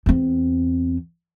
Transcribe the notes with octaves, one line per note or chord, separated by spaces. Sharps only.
E2 C4